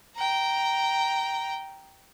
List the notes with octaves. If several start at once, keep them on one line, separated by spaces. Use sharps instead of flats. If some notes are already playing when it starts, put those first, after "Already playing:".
G5 A#5